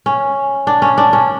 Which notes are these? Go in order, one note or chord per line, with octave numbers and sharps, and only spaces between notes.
C#4
D4
C#4
D4
C#4